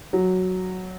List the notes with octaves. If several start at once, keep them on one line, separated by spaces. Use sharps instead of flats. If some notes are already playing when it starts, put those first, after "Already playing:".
F#3